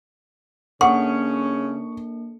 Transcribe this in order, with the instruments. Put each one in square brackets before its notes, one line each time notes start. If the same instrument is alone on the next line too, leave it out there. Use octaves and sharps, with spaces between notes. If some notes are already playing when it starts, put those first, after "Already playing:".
[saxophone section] C#3 C#4 [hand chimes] A#3 D4 A4 [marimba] F#5 [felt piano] C#6